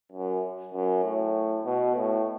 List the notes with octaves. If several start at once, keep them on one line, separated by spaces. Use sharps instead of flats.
F#2
F#2
A2
B2
A2